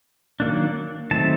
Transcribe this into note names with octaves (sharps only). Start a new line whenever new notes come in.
D#3 F#3 A#3 D4
D#3 F#3 A3 C4 A5